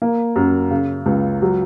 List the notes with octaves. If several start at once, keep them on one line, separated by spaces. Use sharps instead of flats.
A#3
F#2
C#3
C#2
F#3